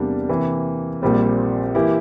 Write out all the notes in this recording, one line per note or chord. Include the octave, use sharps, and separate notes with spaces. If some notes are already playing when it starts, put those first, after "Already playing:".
Already playing: E2 C3 G3 A#3 D4
C3 E3 A#3
A#1 A#2 G3 C4
E3 A#3 E4 G4